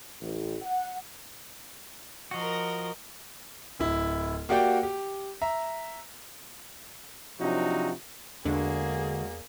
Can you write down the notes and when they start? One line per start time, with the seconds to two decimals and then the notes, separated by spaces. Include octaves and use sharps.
0.21 A1
0.62 F#5
2.31 F3 F#4 A#4 D#5
3.79 D1 E4
4.49 A#3 F#4 G4 D5 F#5 G5
4.83 G4
5.42 E5 A#5
7.40 C3 F3 F#3 D4 D#4 F#4
8.45 E2 D3 G#3 A#3 C4 D4 F#4 G#4